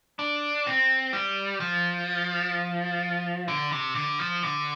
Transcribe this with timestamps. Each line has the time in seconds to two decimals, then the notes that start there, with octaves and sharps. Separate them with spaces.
0.19 D4
0.67 C4
1.13 G3
1.60 F3
3.48 D3
3.72 C3
3.95 D3
4.19 F3
4.43 D3